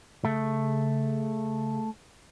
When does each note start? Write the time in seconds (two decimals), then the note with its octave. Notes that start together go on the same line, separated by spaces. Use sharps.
0.25 C#3 A3